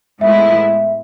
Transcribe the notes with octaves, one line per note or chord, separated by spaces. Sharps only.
A2 G#3 B3 E4 E5